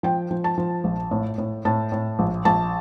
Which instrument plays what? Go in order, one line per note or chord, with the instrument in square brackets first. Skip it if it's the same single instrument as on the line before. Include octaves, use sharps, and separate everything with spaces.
[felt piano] F3 G5
F3
A5
F3
A#1
A2
A2
A2 A5
A2
A#1
A#1 A5